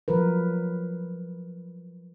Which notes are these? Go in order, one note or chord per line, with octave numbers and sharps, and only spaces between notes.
F3 F#3 F#4 A#4 B4